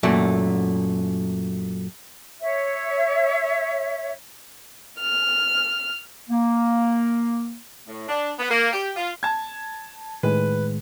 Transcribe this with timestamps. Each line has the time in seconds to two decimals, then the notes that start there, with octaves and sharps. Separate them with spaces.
0.03 F#2 A#2 A3
2.41 C#5 E5
4.98 F6
6.30 A#3
7.88 A2
8.09 D4
8.39 B3
8.51 A#3
8.73 G4
8.96 F4
9.23 A5 G#6
10.23 A2 D#3 G#3 B4